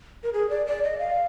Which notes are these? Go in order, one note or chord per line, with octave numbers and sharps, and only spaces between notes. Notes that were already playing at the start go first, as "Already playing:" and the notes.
A#4
G#4
D5
D5
D#5
F5